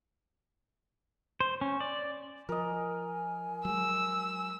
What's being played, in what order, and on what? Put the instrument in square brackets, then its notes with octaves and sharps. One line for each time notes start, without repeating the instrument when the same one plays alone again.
[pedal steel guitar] C5
C#4
D5
[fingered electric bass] F3 [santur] A#4 D#5 [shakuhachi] G#5
[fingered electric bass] F#3 G#3 [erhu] E6